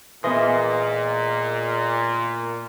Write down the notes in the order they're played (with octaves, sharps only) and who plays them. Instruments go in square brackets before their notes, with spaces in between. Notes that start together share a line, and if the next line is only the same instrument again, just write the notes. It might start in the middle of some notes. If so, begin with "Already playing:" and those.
[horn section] A#2 [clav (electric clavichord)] E3 [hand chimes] B3 C6 [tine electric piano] G#4 D#5